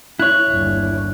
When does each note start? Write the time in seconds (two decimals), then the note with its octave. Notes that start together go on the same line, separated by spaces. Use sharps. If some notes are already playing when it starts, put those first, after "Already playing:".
0.19 E4 C#5 F#6
0.48 G1 D#2